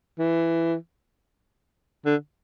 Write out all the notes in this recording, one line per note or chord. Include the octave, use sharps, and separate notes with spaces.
E3
D3